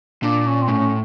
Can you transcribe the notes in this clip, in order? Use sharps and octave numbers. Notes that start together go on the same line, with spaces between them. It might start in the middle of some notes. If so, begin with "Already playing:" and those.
A#2 D4
C#4
C4
A2 C#4